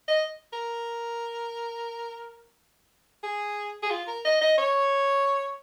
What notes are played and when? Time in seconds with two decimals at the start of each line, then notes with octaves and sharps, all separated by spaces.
0.08 D#5
0.53 A#4
3.23 G#4
3.83 G#4
3.90 F4
4.08 A#4
4.25 D#5
4.41 D#5
4.58 C#5